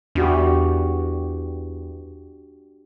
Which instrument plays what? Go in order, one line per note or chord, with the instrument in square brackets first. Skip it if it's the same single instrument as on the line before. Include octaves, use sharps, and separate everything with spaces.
[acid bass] E2 [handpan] D4 F#4 G4